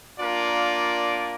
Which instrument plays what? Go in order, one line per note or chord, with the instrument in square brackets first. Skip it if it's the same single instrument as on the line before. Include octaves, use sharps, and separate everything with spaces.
[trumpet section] A#3 D4 F4 A#4 D5